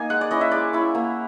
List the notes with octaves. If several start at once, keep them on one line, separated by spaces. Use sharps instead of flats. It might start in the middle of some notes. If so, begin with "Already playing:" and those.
Already playing: A#3 D#4 G#5
G#3 F#5
D5
C#4 E4 D#5
E5
G#3 D5
C#4 E4
A#3